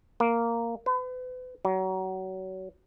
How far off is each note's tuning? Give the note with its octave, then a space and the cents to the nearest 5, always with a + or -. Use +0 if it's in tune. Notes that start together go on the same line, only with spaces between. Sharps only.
A#3 -5
B4 +40
F#3 +30